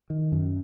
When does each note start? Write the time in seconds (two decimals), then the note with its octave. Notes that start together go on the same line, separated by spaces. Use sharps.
0.10 D#3
0.32 F#2